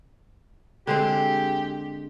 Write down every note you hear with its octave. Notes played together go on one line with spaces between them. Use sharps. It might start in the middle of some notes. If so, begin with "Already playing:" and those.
D3 G#3 C4 G4